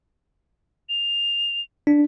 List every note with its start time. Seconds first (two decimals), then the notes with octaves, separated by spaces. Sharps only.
0.89 F7
1.87 D4